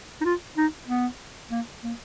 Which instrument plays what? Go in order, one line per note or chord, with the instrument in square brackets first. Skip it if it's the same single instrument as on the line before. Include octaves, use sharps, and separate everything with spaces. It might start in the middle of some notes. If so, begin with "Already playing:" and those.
[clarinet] D#4
F4
D#4
B3
A#3
A#3